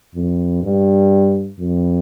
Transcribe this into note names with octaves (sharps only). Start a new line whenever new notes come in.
F2
G2
F2